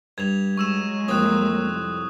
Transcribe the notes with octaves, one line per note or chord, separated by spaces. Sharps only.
G2 G#6 F7
F#3 G#3 C#6 E6 E7
F2 A#3 C4 D#6 F#6
C2